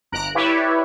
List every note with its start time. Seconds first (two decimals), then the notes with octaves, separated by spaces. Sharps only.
0.12 G1 A#5 F#6 D7
0.35 E4 G4 B4 C#5 D5 E5